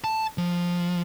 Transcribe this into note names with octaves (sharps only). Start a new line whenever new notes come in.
A5
F3